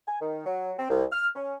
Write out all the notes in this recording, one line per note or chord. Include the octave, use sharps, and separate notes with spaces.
G#5
D#3
F#3
C4
C2
F6
C#4